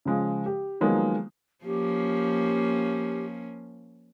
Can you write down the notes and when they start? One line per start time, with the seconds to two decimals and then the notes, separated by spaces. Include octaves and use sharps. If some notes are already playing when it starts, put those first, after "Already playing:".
0.05 C#3 F3 G#3
0.46 G4
0.81 D#3 F3 F#3 G#3 A#3 B3
1.65 F3 A#3 C#4 G4